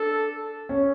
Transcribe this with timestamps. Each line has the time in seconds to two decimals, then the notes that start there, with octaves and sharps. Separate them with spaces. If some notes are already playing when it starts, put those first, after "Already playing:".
Already playing: D4 A4
0.69 C#4